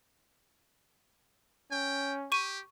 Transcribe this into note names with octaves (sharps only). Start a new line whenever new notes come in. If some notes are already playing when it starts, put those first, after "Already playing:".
C#4 G5
G4 C#6 D#7